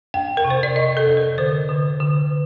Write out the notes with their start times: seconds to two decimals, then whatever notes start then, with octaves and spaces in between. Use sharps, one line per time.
0.14 F2 G5
0.37 A#4
0.45 C3
0.50 C5
0.63 D5
0.76 C3 D#5
0.97 A4
1.07 F2
1.17 A#4
1.38 D3 C5
1.69 D3
2.00 D3